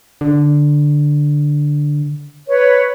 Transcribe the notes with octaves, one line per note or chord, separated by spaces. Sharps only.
D3
B4 C#5